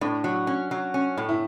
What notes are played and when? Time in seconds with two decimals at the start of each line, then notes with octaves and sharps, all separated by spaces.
0.01 A2 D4
0.24 F#3
0.47 C#4
0.71 F#3
0.94 C#4
1.17 A2
1.29 E4